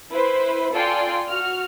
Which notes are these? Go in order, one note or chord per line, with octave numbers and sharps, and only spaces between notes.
E4 B4 C5
F4 A4 D5 G5 G#5 C6
F#4 F6